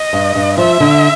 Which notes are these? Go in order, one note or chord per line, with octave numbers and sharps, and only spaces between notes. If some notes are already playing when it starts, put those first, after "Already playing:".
Already playing: D#5
G2
G2
F3 E5
D3